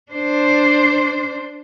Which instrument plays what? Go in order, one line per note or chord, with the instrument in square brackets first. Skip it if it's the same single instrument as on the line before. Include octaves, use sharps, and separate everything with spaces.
[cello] D4 C5